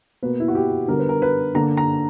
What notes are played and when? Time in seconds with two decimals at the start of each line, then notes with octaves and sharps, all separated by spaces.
0.23 B2 A#3 B4
0.40 E4
0.48 F#4
0.55 G4
0.88 D3 G3 B3 A#4
0.99 B4
1.09 A#4
1.22 B4
1.55 D3 A#3 A#5
1.77 A#5